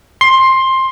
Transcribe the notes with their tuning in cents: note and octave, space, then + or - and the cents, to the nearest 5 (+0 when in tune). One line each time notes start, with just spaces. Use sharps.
C6 +15